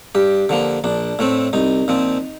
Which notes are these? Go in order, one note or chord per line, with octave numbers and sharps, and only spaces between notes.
G2 G4
D3 F3 A#3
A#1 D4
A2 A3 C4
C2 D#4
A#2 F3 C4